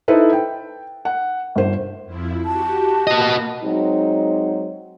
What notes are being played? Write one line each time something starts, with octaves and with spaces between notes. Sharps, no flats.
D#4 E4 A4 B4 C5
G5
F#5
G1 C5
F2 F3 E4
F#4 G4 A5
A#3 F#4 D#5
F#3 G#3 C4 D#4